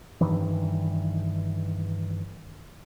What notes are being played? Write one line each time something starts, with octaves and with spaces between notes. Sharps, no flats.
G2 D#3 E3